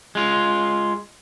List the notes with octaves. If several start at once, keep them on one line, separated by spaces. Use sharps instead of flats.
G#3 F4